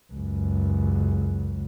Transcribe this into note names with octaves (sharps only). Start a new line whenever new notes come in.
C#2 F#2